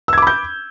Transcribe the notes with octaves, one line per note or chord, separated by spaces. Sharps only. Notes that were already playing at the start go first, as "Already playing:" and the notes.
B5 D6 E6 G6 G#6